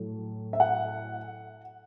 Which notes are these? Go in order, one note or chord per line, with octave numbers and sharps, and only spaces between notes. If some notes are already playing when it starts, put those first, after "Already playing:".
Already playing: A2 F#3 A3
E5
F#5